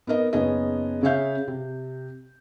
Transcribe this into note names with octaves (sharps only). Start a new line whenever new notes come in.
B3 D#4 A#4 D#5
F#1 B3 C#4 D#4 G#4 D#5
C#3 G#4 C#5 E5 F5 G6
C3